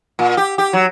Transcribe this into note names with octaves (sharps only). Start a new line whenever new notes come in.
A#2
G4
G4
F#3